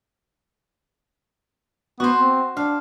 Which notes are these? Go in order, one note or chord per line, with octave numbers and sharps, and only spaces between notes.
B3 F#4 C5
C4
D4 F5